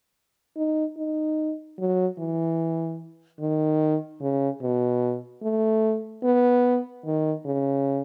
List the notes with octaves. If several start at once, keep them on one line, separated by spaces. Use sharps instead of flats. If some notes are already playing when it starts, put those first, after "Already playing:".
D#4
D#4
F#3
E3
D#3
C#3
B2
A3
B3
D#3
C#3